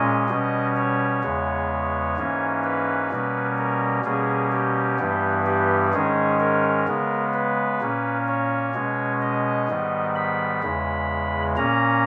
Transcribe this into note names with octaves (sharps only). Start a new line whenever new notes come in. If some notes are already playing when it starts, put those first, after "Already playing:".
Already playing: A#2 G#3 C#4 D#5
B2 G3 C#4
C#5
E2 C#3 G#3 B3
G#2 E3 A#3 C#4
B4
B2 G3 A#3 C#4
A#4
B2 G3 A#3 C#4 G#4
G4
G2 E3 G3 B3
G4
G#2 D#3 G#3 C#4 G#4
A#4
C#3 G#3 B3
B4
A#2 A#3 C#4
C#5
B2 G#3 C#4
D#5
G#2 D#3 G3 B3
B5
E2 C#3 G#3
A#2 A#3 C#4 A#5